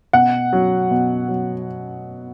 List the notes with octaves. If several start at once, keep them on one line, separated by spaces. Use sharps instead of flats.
B2 F#5
F#3
B2
F#3